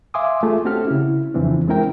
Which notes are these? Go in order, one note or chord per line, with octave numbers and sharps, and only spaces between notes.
E5 F5 G#5 C6 D6 D#6
A3 F4 G#4
C4 C#4 F#4 G4 A4 F6
C#3 E4
F2 C#3 E3 C4 D4
G#3 C4 C#4 E4 A#4 G5